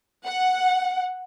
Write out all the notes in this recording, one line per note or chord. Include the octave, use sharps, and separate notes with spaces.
F#5